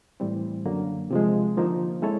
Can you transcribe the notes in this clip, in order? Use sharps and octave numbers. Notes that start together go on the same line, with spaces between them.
A2 E3 G3 C4
F#2 D3 F#3 A#3
C3 F3 G#3
D3 F3 A#3 D#4
G#3 C4 E4 A4 C#5